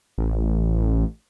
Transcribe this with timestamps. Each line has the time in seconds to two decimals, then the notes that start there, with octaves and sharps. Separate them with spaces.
0.18 A1